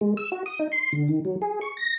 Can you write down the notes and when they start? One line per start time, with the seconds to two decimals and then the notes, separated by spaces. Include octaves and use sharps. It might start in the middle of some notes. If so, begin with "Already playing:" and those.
0.01 G#3
0.17 E6
0.32 F#4
0.46 D#6
0.59 D#4
0.72 C6
0.93 D3
1.08 D#3
1.25 F#3
1.42 G#4
1.61 C#6
1.77 A#6